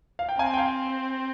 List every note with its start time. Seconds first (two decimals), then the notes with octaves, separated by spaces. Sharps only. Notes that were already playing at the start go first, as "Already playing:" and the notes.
0.19 F5
0.29 G5
0.39 C4 F5 G#5
0.54 G5
0.58 F5 G#5